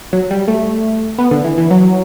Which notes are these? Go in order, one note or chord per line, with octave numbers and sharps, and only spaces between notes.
F#3
G3
A3
B3
D3
E3
E3
F#3